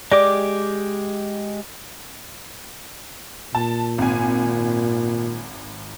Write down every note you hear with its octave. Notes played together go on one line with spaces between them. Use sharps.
G#3 G4 D5 D6
A#2 A5
G#1 G#5